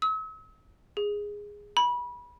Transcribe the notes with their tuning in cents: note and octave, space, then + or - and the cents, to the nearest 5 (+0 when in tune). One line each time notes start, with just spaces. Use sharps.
E6 -45
G#4 -10
B5 -25